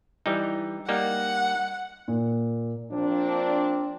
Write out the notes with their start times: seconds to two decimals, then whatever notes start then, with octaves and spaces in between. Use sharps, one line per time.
0.26 E3 G3 D#4
0.89 G3 A#3 D#4 F#5
2.08 A#2
2.92 F3 A#3 C4 D4